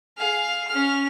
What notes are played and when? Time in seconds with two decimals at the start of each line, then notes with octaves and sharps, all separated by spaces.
0.17 G#4 F5
0.67 C#4 F6